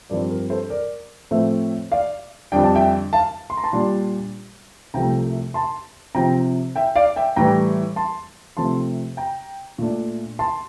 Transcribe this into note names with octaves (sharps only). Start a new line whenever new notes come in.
G2 F3 C4 A#4 D5
A#4
A4 C5
A#4 D5
A2 F3 A3 C4 C5 E5
D5 F5
F2 D3 G3 D4 G5
A5
E5 G5
F5 A5
C6
A#5
A5 C6
A#2 G3 D4
C2 C3 F3 A3 G5 A#5
A5 C6
C3 F3 C4 G5 A#5
E5 G5
D5 F5
E5 G5
A2 E3 G3 G5 A#5
A5 C6
C3 F3 A3 C4 A5 C6
G5 A#5
A#2 A3 D4
A5 C6